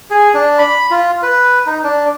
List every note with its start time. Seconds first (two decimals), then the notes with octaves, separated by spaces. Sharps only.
0.10 G#4
0.34 D4
0.59 B5
0.91 F4
1.23 B4
1.66 D#4
1.84 D4